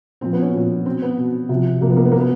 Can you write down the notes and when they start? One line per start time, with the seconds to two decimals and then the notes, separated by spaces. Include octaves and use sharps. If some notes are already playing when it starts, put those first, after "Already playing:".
0.21 A#2 F3 C4
0.33 B3
0.42 C#4
0.54 A#2 F3
0.86 B2 C4
1.02 B3
1.18 B2
1.49 C3 F3
1.81 C3 A#3
1.86 F3 B3
1.96 A#3
2.05 B3
2.12 B2 A#3
2.20 B3